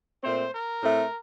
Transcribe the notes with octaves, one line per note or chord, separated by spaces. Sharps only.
A#2 A3 C4 C5
A#4
A2 A3 C4